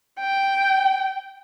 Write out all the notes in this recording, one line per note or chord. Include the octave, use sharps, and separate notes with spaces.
G5